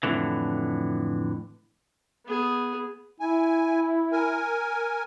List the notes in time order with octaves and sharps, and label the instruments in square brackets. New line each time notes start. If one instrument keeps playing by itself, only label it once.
[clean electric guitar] F2 A2 D3 E3
[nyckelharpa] B3 G#4
[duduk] E4 [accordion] G#5
[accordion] A#4 G#5